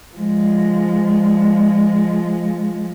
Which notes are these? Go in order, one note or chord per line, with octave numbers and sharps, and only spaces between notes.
F3 G#3